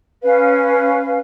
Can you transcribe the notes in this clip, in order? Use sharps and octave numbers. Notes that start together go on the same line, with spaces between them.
C#4 B4 F5